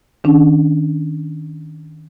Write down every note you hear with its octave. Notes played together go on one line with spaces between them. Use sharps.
D#3 C#4 D4